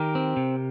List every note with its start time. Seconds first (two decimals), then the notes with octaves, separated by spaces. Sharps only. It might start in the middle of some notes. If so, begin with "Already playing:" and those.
Already playing: D#3 G4 A#4
0.15 C4
0.37 C3